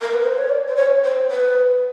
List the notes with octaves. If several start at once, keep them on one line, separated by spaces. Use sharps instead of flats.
A#4
B4
C5
C#5
D5
C5
C#5
C5
B4